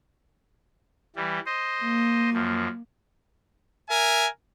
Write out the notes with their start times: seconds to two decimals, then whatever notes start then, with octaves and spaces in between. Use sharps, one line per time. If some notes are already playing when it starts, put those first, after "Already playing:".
1.16 E3 G3
1.46 C5 D#5
1.83 A#3
2.33 F#2 F3
3.89 A#4 E5 G#5